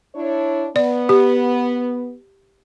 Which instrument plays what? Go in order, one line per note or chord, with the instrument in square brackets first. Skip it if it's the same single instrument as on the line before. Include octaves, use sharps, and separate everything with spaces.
[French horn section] D4 E4 C#5
[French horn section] B3 [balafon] D5
[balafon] G4